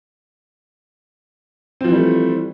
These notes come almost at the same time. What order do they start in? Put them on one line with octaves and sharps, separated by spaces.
C4 F3 E3 G3 A3